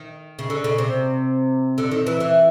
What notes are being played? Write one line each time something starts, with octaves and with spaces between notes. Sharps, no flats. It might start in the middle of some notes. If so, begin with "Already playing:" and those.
Already playing: D#3
C#3
D3
C#3
C3
D3
D#3
E3
E3